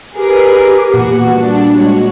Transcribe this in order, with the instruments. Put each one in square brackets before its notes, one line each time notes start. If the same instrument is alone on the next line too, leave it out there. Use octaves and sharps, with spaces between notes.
[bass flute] G4 [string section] G#4 A#4 B4
[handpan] A#2 [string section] E3 B3 F#4
[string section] G3 D4
[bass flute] G#3 [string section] F#4 C#5